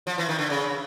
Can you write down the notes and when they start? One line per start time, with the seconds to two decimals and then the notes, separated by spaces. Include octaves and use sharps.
0.07 F3
0.18 E3
0.29 D#3
0.39 D3
0.50 C#3